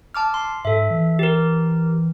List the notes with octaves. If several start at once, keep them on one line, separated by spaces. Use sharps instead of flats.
A5 D6 F6
C6
G#2 A4 E5
E3
G4 A#4